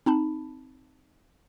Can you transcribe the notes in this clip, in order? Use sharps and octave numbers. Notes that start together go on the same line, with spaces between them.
C4 D#4 A5 B5